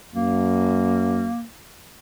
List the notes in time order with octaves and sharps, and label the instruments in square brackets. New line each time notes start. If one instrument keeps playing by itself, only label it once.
[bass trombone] F#2 [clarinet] A#3